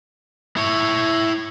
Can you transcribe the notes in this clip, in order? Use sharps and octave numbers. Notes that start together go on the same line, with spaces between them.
E4 C#5